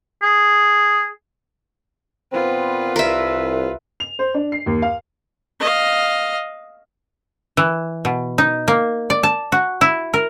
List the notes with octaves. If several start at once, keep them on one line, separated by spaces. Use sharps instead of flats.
G#4
A#2 B3 C4 F4 B4
C2 A#4 E5
F7
C5
D4
C7
D#2
F5
D#5 F5
E3
B2
D#4
A#3
D5
A5
F#4
E4
A#4